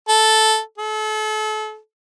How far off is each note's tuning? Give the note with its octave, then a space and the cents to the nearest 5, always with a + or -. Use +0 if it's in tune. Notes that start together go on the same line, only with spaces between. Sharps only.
A4 -5
A4 -35